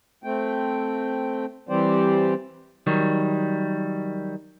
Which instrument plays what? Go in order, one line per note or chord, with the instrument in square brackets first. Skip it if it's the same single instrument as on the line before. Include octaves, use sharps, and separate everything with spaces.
[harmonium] A3 C4 G5
E3 G3 C4 G4 C5 D5
[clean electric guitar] D#3 F#3 G3